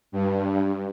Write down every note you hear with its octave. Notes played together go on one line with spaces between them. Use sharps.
G2